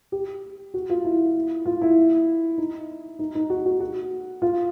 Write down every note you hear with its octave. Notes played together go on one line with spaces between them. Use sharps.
G4
F#4
F4
E4
F4
E4
D#4
D#4
D#4
F#4
F#4
F#4
F4